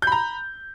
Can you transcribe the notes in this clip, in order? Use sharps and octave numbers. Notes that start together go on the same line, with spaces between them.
A#5 B5 G6